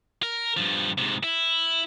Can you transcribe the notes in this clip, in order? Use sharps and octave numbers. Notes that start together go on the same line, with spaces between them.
A#4
G2 F3
G#2 C3
E4